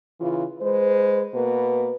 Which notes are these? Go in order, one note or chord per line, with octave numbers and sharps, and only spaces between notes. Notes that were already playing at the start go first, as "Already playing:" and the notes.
C#3 E3 F4
G#3 B4 C5
B2 A#3 B4